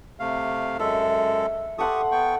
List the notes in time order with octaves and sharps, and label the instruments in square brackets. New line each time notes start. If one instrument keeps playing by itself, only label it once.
[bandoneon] C3 A3 F5
[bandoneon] F#2 G#3 A4 [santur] E5
[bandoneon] G4 C#6 D#6 [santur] A4 F#5 C6
[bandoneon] B3 G5 C#6